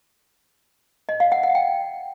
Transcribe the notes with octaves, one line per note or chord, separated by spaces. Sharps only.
D#5
F5
F#5
F#5
G5